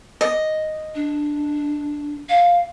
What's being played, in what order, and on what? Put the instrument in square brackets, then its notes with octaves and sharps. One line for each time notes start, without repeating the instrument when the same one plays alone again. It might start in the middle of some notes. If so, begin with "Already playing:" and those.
[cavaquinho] D#5
[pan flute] D4
F5